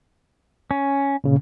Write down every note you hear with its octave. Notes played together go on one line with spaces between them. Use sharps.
C#4
A#2 C#3